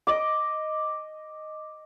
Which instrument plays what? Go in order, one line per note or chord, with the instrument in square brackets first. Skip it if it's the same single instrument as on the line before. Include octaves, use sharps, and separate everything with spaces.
[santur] D#5 D6